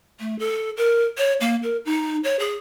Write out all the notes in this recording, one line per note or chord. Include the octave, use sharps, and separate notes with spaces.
A3
A4
A#4
C#5
A#3
A#4
D#4
C#5
G#4